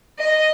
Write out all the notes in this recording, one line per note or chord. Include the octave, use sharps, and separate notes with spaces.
D#5